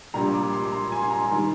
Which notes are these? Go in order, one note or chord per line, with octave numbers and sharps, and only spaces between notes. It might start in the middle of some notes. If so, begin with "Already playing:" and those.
A#1 A#2 G3 A#5
D6
C6
C6
A#5
G#5
C6
A#5
D#3 G3